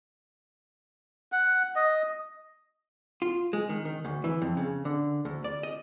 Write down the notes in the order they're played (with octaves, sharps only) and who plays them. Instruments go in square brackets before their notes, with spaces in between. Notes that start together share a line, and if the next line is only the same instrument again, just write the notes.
[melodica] F#5
D#5
[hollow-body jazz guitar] F4
G#3
D#3
D#3
D2
E3
F2
C#3
D3
D2
D5
D#5